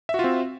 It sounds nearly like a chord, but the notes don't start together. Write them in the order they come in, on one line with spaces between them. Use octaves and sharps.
E5 F#4 F4 C4